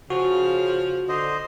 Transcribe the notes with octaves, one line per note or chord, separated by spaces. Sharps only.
C#3 F3 F#4
D3 C5 D#5